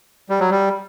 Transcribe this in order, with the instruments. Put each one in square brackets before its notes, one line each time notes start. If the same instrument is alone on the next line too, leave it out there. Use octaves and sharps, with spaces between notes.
[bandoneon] G3
F#3
G3